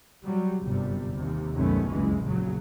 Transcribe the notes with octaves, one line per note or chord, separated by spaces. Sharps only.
F#3 G3
G1 F#2 C3 G3
D#2 C3
C2 F#2 D#3 A3 B3 C#4
F#1 C#2 G2 E3 G#3
A#1 E2 C#3 F#3